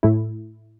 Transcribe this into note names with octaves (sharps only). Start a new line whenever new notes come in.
A2 A3 E4